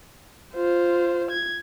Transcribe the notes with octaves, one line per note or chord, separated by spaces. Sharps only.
F4 C5
G#6